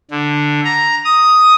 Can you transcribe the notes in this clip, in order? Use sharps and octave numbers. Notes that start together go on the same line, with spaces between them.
D3
A#5
D#6